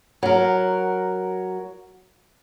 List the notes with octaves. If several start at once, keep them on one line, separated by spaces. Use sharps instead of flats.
F#3 A#4